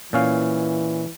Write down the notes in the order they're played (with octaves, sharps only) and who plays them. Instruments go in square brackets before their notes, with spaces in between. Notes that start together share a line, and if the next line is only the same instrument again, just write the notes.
[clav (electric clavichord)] A#2 C#4 F5 [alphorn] E3